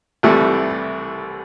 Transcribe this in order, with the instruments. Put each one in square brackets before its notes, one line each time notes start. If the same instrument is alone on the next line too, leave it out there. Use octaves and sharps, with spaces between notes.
[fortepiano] C2 C3 E3 G3 A3